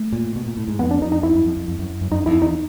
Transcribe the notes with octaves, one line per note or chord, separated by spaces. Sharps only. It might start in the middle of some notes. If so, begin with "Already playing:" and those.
Already playing: A3
A#2
B2
A#2
A2
G#2
F2 B3
D4
F2 D#4
D#4
F2 E4
F#2
F2
F2
F2
F#2
F#2
F#2 D#4
F2 E4
E2 D#4